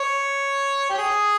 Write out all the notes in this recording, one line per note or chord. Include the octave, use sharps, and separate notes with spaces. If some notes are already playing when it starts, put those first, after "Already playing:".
Already playing: C#5
G4
G#4